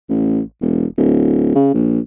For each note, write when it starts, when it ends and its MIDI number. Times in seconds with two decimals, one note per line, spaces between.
0.09 0.41 33
0.61 0.86 28
0.97 1.55 26
1.55 1.70 49
1.74 1.99 34